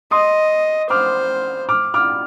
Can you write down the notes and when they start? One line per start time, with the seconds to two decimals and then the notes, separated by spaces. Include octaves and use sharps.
0.11 D#5 C6 D#6
0.90 C5 D6 F6
1.69 D6 F6
1.94 D6 F6